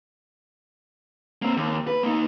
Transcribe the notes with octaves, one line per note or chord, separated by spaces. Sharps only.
A#3 C4
D#2
B4
A#3 D#4